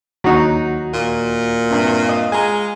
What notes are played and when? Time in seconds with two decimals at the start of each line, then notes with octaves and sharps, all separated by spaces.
0.24 D#2 F#3 D#4 F#4 F#5
0.93 A#2
1.71 G2 C3
2.09 D#5 F5
2.32 G#3 G#5 A#5